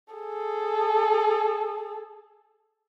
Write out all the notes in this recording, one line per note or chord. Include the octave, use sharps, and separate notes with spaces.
G#4 A4